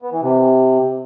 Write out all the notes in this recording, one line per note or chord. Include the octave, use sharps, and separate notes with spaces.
B3
E3
C3